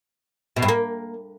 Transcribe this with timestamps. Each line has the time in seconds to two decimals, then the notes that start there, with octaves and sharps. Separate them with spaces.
0.56 B2
0.62 G2
0.68 A#3